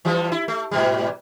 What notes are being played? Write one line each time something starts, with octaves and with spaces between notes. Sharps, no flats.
E3 F3 G3
E4
A3
G#2 B2 G3